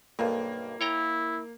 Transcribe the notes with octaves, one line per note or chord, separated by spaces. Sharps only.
B1 G2 A#3
E4 C#5 G5 A#5